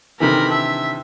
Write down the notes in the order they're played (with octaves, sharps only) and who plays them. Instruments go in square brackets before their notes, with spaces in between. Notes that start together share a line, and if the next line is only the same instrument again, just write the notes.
[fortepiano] C3 D#3 E3 [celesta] D4 D#4 A4 [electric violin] A#4 B5
[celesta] D4 A5 [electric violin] E5